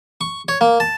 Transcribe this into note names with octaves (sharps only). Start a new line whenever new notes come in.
C#6
C#5
A#3
A5